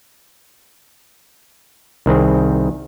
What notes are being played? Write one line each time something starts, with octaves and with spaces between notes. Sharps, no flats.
C2 D#3 C4 G#4